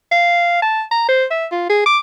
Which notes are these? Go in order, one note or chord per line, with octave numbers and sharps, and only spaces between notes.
F5
A5
A#5
C5
E5
F4
G#4
D6